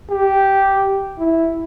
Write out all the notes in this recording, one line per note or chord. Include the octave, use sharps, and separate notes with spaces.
G4
E4